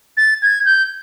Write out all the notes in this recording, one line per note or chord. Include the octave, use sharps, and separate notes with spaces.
A6
G#6
G6